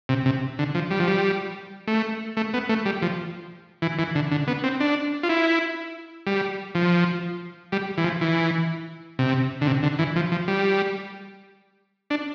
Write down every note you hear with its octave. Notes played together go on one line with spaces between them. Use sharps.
C3
C3
D3
F3
G3
F3
G3
A3
A3
B3
A3
G3
F3
E3
E3
D3
D3
B3
C4
D4
F4
E4
G3
F3
G3
E3
F3
E3
C3
D3
C3
D3
E3
F3
F3
G3
D4